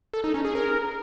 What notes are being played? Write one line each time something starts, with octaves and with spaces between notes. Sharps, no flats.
A4
D#4
C#4
G#4
A#4